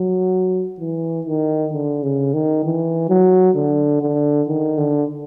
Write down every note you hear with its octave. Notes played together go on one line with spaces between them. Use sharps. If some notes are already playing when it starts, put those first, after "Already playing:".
Already playing: F#3
E3
D#3
D3
C#3
D#3
E3
F#3
D3
D3
D#3
D3